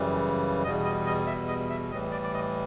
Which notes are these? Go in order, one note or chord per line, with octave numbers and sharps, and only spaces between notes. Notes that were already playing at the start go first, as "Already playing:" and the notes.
Already playing: F#2 C#3 E3 G3
E2 B2 G3 D#5
D#5
D#5
E5
D#5
E5
A2 E3 G3 D#5
D5
D5
D#5